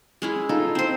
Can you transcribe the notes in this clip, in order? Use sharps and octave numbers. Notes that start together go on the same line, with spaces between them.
G#3 C#4 E4
D#4 F4 A4
C4 C5